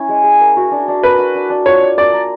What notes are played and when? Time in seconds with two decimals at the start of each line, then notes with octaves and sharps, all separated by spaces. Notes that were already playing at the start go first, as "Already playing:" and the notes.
Already playing: C#4 E4
0.09 G#3
0.24 G#4
0.40 A#4
0.56 F#4
0.71 D4
0.88 D4
1.03 A#4 B4
1.19 F#4
1.35 D4
1.50 D4
1.66 F4 C#5
1.81 D4
1.98 A#3 D5
2.13 A#4